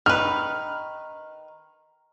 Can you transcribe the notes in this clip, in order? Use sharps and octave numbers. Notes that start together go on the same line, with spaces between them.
D#3 B4 F6